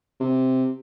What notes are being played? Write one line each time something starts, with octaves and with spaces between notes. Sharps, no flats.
C3